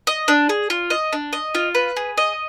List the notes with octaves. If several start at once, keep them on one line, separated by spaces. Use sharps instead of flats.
D#5
D4
G#4
F4
D#5
D4
D#5
F4
B4
G#4
D#5